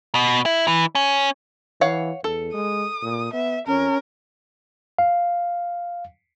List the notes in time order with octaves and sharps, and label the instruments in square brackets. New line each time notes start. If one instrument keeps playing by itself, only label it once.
[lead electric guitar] B2
E4
E3
C#4
[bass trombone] E3 [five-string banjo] C#5 F5 F#5
[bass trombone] E2 [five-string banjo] A4
[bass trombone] G#3 [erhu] D#6
[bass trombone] A#2
[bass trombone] B3 [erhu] E5
[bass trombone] F2 [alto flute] C#4 [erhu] A#4
[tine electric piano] F5